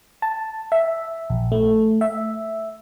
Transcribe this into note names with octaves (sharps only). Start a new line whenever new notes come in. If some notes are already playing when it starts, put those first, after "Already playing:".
A5
E5
A#1
A3
E5